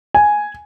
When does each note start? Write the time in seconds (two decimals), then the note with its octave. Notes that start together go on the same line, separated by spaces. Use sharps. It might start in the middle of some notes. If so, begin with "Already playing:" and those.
0.14 G#5